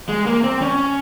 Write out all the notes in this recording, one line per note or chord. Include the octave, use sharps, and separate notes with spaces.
G#3
A#3
C4
C#4